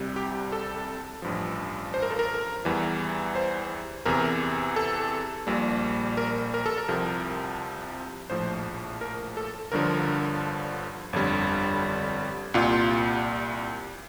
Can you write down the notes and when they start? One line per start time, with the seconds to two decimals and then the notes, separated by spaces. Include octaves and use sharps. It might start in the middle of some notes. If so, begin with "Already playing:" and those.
Already playing: C2 C3 G3
0.16 G4
0.52 A4
1.22 A1 G2 F3
1.94 C5
2.02 A#4
2.10 A4
2.19 A#4
2.65 E2 E3 G3
3.35 C5
4.05 E2 C3 E3 A#4
4.76 A4
5.47 A#1 A#2 G3
6.17 A#4
6.54 A#4
6.66 A4
6.78 A#4
6.88 C2 C3 F3
8.30 A#1 A2 F3 C5
9.01 A#4
9.37 A4
9.72 G1 G2 D3 F3 A#4
11.13 G1 F2 D3 G3
12.54 C2 A#2 G3 F4